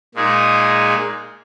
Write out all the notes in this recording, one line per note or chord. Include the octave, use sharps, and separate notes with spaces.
A#2 G#3 D#4 G#4